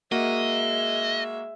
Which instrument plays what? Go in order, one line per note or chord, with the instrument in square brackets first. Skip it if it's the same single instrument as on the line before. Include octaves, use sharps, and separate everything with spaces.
[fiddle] G#3 E5 [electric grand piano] A#3 F#4 [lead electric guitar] D#5